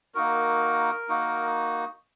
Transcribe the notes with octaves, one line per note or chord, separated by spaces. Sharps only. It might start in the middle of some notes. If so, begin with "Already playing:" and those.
A#3 D#4 F#4 A#4
A#3 D#4 F#4